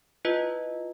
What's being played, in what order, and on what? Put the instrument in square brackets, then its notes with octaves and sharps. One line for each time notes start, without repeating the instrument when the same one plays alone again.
[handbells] E4 F4 B4 D#5